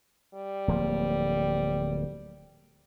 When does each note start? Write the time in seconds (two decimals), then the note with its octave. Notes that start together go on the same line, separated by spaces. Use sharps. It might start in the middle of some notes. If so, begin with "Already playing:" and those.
0.35 G3
0.68 D1 F3 A#3